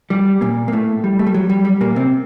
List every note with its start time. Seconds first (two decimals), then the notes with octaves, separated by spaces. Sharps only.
0.10 G3 G4
0.41 A#2 A#3
0.68 A#3
0.72 A2 A3
1.04 G3
1.19 A3
1.26 G3
1.34 F#3
1.50 G3
1.65 G3
1.81 A#2 A#3
1.96 C3 C4